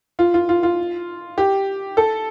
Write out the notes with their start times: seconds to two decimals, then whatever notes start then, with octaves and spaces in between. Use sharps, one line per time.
0.19 F4
0.34 F4
0.49 F4
0.63 F4
1.38 G4
1.97 A4